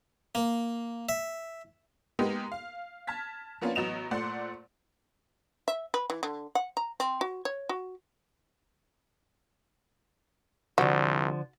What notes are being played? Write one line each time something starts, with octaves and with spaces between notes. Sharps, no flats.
A#3
E5
G#3 A#3 B3 D#4 G4 A#4
F5
A5 F6 G#6 B6
F3 A#3 B3 C#4 D4 F4
A1 F#3 B3 D#5 E7 F7
A#2 A3 C5 D5 F#5 C6
E5
B4
E3
D3
F#5
A#5
C4
F#4
C#5
F#4
C2 D3 F3 F#4